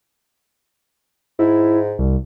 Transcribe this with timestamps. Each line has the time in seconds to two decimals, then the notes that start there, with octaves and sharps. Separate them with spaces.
1.39 G#2 E4
1.99 C2